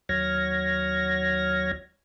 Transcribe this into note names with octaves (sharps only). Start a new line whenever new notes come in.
D#2 F#3 C#5 F6 G#6 A#6